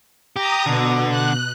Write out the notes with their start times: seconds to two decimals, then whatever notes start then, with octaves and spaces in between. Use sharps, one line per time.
0.36 G4 A#5 D#6
0.66 B2 D3
1.10 F#6